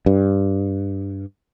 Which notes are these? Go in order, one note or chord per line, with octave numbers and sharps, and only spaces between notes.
G2